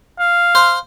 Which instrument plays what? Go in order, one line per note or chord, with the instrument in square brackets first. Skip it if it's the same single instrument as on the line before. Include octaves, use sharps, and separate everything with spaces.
[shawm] F5
[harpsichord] C5